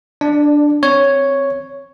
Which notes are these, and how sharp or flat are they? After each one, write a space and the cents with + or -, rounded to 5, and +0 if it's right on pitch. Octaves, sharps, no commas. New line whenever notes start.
D4 +0 D5 +25
C4 +0 C#5 +0